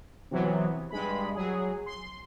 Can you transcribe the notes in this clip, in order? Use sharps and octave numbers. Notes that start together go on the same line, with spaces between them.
C3 E3 F#3 B3
G2 G#3 B5
F#3 G#4
C6